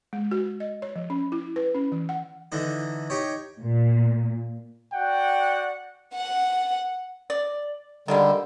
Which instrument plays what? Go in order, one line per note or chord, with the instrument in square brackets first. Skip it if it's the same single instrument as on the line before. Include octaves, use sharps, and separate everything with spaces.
[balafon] G#3
F#4
D#5
C#5
F3
C#4
E4
B4
C#4
E3
F#5
[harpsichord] D3 E3 D#4
D#4 G4 C#5
[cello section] A#2
[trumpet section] F#4 D5 F#5 [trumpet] G5
[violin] F#5
[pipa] D5
[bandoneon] D3 G3 [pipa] D#3 G#3 A#3